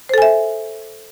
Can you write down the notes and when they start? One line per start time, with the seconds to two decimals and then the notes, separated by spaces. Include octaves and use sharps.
0.09 C5
0.14 A4
0.18 G#5
0.22 E5